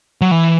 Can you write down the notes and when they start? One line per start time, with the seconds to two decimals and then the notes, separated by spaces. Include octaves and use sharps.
0.21 F#3
0.31 E3